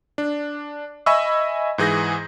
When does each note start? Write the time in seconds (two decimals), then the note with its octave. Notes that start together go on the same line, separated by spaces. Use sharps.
0.18 D4
1.06 D#5 E5 G#5 B5 C#6 E6
1.78 G#2 E3 G#4 G6 A#6